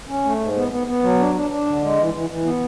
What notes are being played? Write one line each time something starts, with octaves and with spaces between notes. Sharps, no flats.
C#4
A3
G#2
B3
B3
B3
F#3
D4
D4
D4
D3
G#3
E3
E3
E3
B3